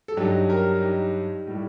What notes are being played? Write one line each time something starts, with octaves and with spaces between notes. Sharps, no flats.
A4
G2 F#3 D#4 G4
G4 A#4
D#4 G4
A2 G3